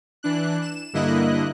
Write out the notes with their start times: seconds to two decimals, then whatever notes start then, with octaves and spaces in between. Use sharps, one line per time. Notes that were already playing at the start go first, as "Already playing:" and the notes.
0.23 E3 D4 F#6
0.62 E7
0.93 G2 D3 A#3 E4 D#5 F#6